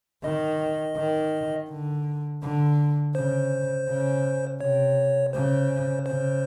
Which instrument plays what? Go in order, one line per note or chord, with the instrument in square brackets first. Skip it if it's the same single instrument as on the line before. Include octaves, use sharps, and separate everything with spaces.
[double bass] D#3 [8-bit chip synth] D#5
[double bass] D#3
D3
D3
[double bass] C#3 [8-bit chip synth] C5
[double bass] C#3
[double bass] C3 [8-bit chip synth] C#5
[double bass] C#3 [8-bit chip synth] C5
[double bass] C#3 [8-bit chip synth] C5